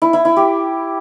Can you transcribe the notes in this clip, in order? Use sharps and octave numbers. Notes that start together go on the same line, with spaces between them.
E4
E4
E4
G4